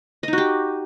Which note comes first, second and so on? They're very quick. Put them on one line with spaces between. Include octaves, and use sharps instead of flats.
D#5 D#4 F#4 G4